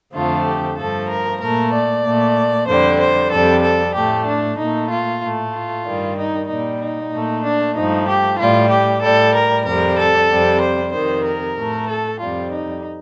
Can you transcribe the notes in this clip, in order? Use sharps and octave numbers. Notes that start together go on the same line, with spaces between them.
F2 D3 F3 A3 F4
G4
G2 F3 A3 A4
A#4
A#2 A3 A#4
D5
A#2 A3
F2 D3 G3 C5
C5
F2 C3 G3 A4
A4
A2 A3 G4
D4
A#2 A3 D#4
F4
A2 A3
F4
G2 D#3 G3
D#4
A#2 G3 D#4
D#4
A#2 A3
D4
G2 F3 A3 D#4
G4
A2 G3 F4
G4
A2 G3 A4
A#4
F2 C3 G3 A#4
A4
F2 C3 G3
C5
F2 C3 D#3 C5
A#4
A2 A3
A4
F2 C3 G3 F4
D#4